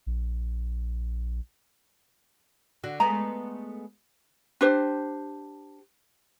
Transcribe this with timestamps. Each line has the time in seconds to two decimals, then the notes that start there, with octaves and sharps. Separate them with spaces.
0.06 A#1
2.84 D3 F#4
3.00 G#3 A3 B3 A#5
4.61 D4 G4 C5